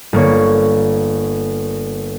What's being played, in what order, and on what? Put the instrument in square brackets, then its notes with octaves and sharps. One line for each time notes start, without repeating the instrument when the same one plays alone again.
[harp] G1 A#3 C#5